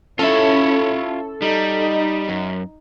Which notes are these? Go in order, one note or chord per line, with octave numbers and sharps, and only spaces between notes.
C#4 E4 F4 A4 C#5 E5
G3 D#4
F#2